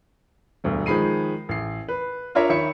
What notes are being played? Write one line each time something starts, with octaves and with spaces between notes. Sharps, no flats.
E1 D2 G2
D#3 F3 G#3 B5 C7 D#7
A1 C7
B4
D4 F4 A#4 C#5 D5 E5
D#3 C#5 E5 B5 C#7